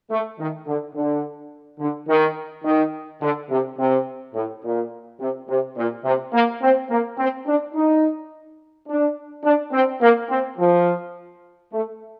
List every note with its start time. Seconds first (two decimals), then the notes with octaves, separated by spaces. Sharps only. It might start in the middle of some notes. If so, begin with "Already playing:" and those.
0.10 A3
0.39 D#3
0.67 D3
0.95 D3
1.80 D3
2.08 D#3
2.64 D#3
3.22 D3
3.50 C3
3.79 C3
4.35 A2
4.64 A#2
5.20 C3
5.48 C3
5.77 A#2
6.05 C3
6.33 A#3
6.62 C4
6.90 A#3
7.18 C4
7.47 D4
7.74 D#4
8.88 D4
9.45 D4
9.73 C4
10.01 A#3
10.29 C4
10.58 F3
11.72 A3